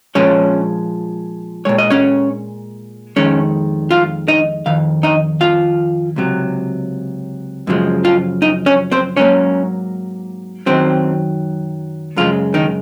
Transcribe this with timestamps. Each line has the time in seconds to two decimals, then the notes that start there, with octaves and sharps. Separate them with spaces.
0.15 A#2 F3 G#3 C#4 C#5
1.65 A#2 G#3 C#5
1.78 D#5
1.90 C#4 C#5
3.16 F2 D#3 G#3 C#4 C#5
3.91 F4 F5
4.28 D#4 D#5
4.66 F2 D#3 F5
5.03 D#4 D#5
5.41 F4 F5
6.16 C#2 C3 F#3
7.67 F#2 C#3 F3 G#3
8.05 F4 F5
8.42 D#4 D#5
8.66 C#4 C#5
8.92 C4 C5
9.17 G#2 F#3 A#3 C#4 C#5
10.66 F#2 D#3 F#3 C4 C5
12.17 F#2 C#3 F3 G#3 F4
12.54 D#3 D#4